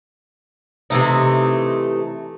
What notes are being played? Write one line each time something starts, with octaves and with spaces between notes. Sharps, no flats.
C3 E3 A3 D#4